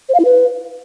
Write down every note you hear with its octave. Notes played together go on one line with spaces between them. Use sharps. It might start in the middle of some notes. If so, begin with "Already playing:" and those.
C5
F5
E4
B4